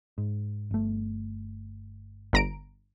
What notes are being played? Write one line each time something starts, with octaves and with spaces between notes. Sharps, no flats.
G#2
G1 A3
G1 A#5 D7